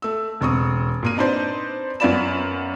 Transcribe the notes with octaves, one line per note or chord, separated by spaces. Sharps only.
A3 E6
E1 C4 C#6 D#6
A#2 A#3 D#7
C4 D4 D#4 B4 C5 D5
F#2 B3 F4 D5 B5 E7